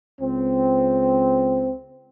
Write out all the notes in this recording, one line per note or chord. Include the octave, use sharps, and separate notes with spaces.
C#2 C4